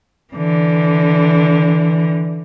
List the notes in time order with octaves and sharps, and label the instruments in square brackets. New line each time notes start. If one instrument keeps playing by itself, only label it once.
[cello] D3 E3